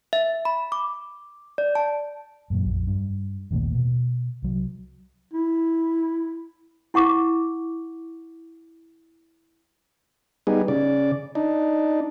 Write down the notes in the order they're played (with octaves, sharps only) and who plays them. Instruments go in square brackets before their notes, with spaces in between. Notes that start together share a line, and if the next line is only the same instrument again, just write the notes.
[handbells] E5
B5
D6
D5
A5
[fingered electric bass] F#2 A#2 F#3
A#1 F2
G2
A1 D#2 A#2 A3
B2
C2 F#3
[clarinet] E4
[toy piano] E4 F#5 C#6 D6
[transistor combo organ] G3 B3 D#4 G#4
C#3 D5
D4 D#4